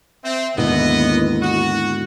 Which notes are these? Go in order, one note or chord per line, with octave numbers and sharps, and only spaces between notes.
C4 E5
D#2 G#2 B2 D3 B3 E4 D#5
F#4